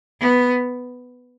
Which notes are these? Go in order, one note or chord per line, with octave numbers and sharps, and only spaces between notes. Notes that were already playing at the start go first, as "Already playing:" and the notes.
B3